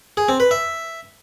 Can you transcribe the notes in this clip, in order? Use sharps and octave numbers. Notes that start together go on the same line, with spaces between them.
G#4
C4
B4
E5